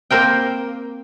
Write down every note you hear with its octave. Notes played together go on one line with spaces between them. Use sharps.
A#3 C4 A#4 C5 G5